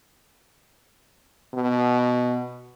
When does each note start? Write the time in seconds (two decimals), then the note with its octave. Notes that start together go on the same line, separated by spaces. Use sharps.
1.54 B2